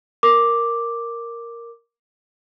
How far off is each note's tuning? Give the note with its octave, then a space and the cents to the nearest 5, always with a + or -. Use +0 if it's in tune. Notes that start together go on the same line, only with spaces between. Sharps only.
A#4 +0 D6 +0